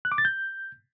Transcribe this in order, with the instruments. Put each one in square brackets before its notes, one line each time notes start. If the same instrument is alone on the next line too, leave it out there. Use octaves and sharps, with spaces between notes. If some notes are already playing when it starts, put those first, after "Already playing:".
[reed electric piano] F#6
D6
A6
G6